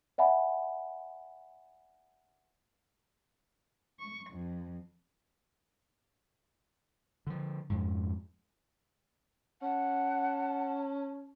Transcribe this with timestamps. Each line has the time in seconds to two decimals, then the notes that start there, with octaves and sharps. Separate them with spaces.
0.18 D5 E5 F#5 G#5 B5
3.99 C#6
4.30 F2
7.27 D3 F3
7.70 F2 G#2
9.62 C#4 F#5 A5